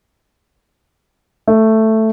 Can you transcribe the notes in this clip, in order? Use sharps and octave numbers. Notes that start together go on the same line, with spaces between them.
A3